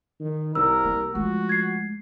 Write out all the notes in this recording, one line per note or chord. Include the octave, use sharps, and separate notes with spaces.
D#3
C2 A#4 E6
A#3
F3 G#3 A3 F#4
G#6 C7